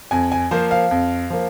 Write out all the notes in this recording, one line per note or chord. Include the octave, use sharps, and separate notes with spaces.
F2 G#5
G#5
F3 A#3 C5
F5
F2
F3 A#3